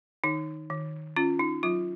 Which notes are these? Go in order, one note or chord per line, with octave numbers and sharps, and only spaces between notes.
D#3 D#4
D#3
C#4 F4
D#4
F#3 F4